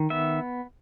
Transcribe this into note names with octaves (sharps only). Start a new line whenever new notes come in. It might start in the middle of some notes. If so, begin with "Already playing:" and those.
Already playing: D#3
B3 E5